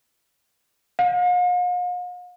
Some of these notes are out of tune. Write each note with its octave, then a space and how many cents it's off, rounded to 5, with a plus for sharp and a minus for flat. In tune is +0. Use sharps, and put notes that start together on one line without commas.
F5 +45